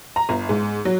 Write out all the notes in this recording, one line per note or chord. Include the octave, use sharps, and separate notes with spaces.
A#5
G1
G#2
F#3